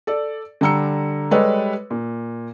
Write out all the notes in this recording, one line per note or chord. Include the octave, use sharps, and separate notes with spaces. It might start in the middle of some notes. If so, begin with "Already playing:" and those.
A4 D5
D3 G3 A#5 E6 C#7
G3 G#3 G4 A4 B4 C#5
A#2